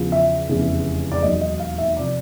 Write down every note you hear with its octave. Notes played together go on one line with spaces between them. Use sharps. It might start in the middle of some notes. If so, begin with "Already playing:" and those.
Already playing: E2 C#3 F3
E5
F1 E2 C#3 E3
D5
E1 D#2 D#3 F#3 D#5
D#5
F5
E5
C3 F3 D5